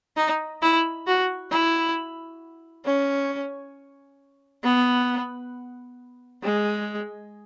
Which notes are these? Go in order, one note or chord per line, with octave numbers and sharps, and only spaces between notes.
D#4
E4
F#4
E4
C#4
B3
G#3